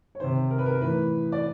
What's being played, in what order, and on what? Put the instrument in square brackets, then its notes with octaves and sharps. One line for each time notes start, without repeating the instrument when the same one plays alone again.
[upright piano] C#5
C3 D#3 C5
A#4
B4
A#4
A2 E3 B4
D5